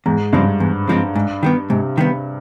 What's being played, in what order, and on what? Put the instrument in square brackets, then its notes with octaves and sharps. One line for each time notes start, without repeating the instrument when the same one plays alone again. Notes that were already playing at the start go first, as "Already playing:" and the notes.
[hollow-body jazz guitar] E2 [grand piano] G#2
[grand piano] G2 [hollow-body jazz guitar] C#3 F3 G#3 C4
[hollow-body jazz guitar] E2
C#3 F3 G#3 C4
G#2
D#3 G3 B3
[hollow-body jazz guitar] G#2 [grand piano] C3
[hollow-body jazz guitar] D#3 G3 B3